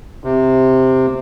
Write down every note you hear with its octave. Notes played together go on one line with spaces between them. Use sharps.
C3